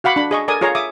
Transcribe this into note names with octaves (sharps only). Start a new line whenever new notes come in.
F#4 F5 F#5 B5 D6
D4 B5
G#4 D#5 C#6
A4 A#4 D5 G#5 D#6
F4 G#4 C#5 F5 A#5
E5 D6 D#6